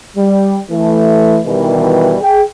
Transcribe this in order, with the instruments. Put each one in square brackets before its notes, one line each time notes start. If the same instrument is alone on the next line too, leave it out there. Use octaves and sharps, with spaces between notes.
[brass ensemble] G3
E3 A3
B2 D#3 E3 G3
G#4 G5